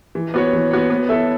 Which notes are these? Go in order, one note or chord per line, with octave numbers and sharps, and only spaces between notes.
E3
B3 F#4 C#5
E3
B3 F#4 C#5
B3
E4 A4 C#5 E5